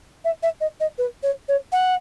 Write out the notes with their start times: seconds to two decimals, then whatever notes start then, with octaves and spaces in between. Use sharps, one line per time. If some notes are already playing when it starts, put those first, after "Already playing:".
0.25 E5
0.43 E5
0.61 D#5
0.80 D#5
0.98 B4
1.23 C#5
1.49 C#5
1.72 F#5